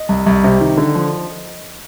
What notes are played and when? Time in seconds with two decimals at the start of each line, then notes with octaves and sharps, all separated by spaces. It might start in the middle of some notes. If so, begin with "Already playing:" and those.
Already playing: D#5
0.09 C2
0.26 C2
0.44 C3
0.61 D#3
0.77 D3
0.95 F3